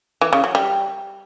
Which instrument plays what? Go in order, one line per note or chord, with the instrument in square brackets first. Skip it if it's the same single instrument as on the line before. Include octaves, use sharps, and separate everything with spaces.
[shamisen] E3
C#3
F#3
G3